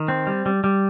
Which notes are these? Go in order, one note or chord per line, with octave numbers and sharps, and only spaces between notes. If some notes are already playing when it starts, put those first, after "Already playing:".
Already playing: D#3
C4
G3
G3
G3